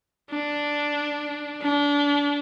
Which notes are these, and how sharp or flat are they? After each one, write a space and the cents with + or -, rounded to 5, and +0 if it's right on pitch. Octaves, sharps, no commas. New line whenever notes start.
D4 -5
D4 -30